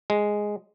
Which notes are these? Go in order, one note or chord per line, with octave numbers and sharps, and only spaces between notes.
G#3